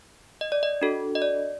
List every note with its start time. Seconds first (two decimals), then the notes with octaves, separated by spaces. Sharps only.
0.41 D#5
0.52 D5
0.63 D#5
0.82 D4 F#4 A4
1.15 D#5
1.22 D5